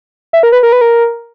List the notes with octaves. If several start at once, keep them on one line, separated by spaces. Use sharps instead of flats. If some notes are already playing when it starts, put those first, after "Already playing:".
E5
A#4
B4
A#4
B4
A#4